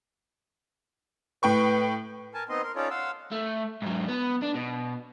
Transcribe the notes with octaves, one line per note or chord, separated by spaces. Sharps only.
A2 B4 G5 C#6
A#4 G#5 A5
B3 C4 D#4 D#5 C6
A#4 C6
C#4 D#4 F4 A4 C#5 D5
F5 F#5 C6 E6
A3
G#2 F#3
B3
D4
B2